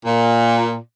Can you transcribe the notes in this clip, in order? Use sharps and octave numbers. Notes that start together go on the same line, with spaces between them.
A#2